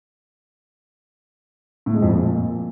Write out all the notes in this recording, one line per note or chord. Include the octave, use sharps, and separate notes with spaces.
A2
G#3
F2
A#2